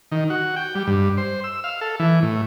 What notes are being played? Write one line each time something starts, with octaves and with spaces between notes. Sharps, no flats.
D#3
F#4
G5
G3
G2
C5
E6
F5
A4
E3
A2